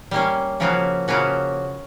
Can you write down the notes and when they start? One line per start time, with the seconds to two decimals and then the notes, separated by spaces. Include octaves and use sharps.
0.11 G3 A#3 C#4
0.60 C#3 F3 A#3 C#4 F#4
1.08 C#3 F3 A#3 C#4 F#4